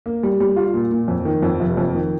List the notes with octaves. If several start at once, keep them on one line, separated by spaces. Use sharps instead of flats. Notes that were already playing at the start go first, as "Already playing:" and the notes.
A#3
G3
G3
F4
A#2
A#2
F2
D#3
F2
F1
F2
D#3